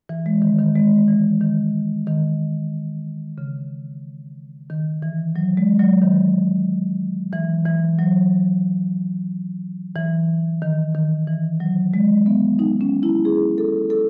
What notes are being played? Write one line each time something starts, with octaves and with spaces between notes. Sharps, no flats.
E3
G#3
D#3
D#3
G#3
E3
D#3
D#3
C#3
D#3
E3
F#3
G#3
F#3
D#3
E3
E3
F#3
E3
D#3
D#3
E3
F#3
G#3
B3
D#4
C#4
E4
G#4
A4
A4